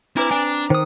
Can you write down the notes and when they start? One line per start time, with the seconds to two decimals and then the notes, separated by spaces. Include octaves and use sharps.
0.17 C4 D4 E4 B4 A#5 D6
0.31 D4 G#5
0.70 D#3 C5 D#6